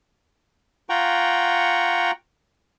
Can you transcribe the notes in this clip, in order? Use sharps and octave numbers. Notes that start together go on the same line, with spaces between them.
F4 F#5 G5 A#5 C#6